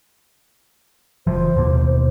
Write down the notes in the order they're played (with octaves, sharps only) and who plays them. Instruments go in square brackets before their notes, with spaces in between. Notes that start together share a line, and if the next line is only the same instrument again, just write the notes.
[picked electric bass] F#1 E3 F3 [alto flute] C5
[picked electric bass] D#2 B2 A#3